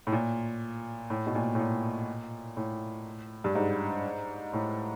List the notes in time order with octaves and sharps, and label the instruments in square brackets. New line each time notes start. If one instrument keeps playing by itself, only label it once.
[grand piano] A2
A#2
A2
B2
A#2
A2
A#2
A2
G2
G#2
A2